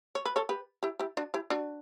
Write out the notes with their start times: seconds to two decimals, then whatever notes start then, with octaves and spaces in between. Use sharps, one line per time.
0.15 C#5
0.25 B4
0.36 A4 C#5
0.49 G4 B4
0.83 E4 G4
0.99 E4 G4
1.17 D4 F#4
1.34 E4 G4
1.50 D4 F#4